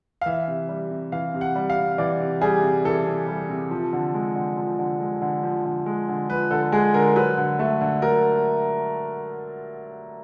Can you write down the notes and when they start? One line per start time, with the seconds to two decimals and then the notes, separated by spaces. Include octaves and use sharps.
0.21 F5
0.26 E3 E5
0.48 C3
0.69 G3
0.91 C3
1.12 E3 F5
1.34 C3
1.41 F#5
1.55 G3
1.70 F5
1.76 C3
1.98 E3 D5
2.20 C3
2.41 G3 G#4
2.63 C3
2.85 E3 A4
3.06 C3
3.28 G3
3.49 C3
3.71 F3
3.93 D3
4.14 G#3
4.36 D3
4.57 F3
4.79 D3
5.01 G#3
5.22 D3
5.43 F3
5.65 D3
5.86 G#3
6.09 D3
6.29 F3 B4
6.51 D3 A4
6.72 G#3 G#4
6.94 D3 A#4
7.16 F#3 B4
7.37 D3
7.59 A3
7.81 D3
8.02 F#3 A#4